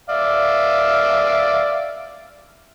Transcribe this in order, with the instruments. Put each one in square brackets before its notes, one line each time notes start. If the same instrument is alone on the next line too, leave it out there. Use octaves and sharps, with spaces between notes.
[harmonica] D5 E5 F5